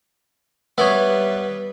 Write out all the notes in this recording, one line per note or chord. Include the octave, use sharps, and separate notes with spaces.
G3 B3 B4 C#5 E5